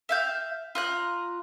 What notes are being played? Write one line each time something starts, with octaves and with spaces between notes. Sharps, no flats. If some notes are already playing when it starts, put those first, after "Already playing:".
E5 F5 G6
F4 A#5 F#6